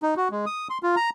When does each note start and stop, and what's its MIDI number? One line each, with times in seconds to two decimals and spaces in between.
0.03 0.14 63
0.17 0.28 66
0.31 0.45 56
0.46 0.68 87
0.70 0.78 84
0.83 0.95 65
0.96 1.10 82